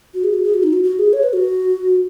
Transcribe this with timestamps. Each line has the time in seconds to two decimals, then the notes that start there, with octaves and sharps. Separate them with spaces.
0.14 F#4
0.24 G#4
0.34 F#4
0.44 G#4
0.54 F#4
0.63 D#4
0.73 F#4
0.84 F#4
0.99 G#4
1.13 C#5
1.23 B4
1.33 F#4